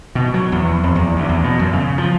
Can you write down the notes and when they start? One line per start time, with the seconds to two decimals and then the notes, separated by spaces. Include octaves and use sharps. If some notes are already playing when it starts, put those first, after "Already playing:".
0.15 B2
0.34 F#3
0.52 E2
0.83 F2
0.95 E2
1.16 D2
1.29 E2
1.44 B2
1.59 F#2
1.73 C#3
1.98 F3